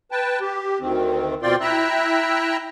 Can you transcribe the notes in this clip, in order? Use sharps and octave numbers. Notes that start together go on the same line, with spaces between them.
B4 G5 A5
G4
D2 D#3 C4
B2 C4 F4 D5 G5 C6
E4 E5 G5 A#5 E6 F#6